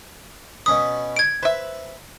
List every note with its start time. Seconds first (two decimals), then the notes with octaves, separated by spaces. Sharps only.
0.66 B2 C#4 B4 D#6
1.16 G#6 D7
1.43 B4 C5 E5